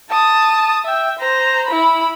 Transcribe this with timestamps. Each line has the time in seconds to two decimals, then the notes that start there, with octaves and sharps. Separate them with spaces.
0.10 A5 D#6
0.85 E5 G5
1.19 C5 A#5
1.68 E4 B5